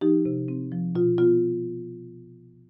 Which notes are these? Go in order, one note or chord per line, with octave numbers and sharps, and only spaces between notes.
F3 D#4 G4
C3
C4
F3
B2 F4
B3 F4